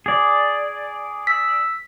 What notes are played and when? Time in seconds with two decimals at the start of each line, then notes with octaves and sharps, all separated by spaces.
0.06 G#4 D5
1.27 E6 B6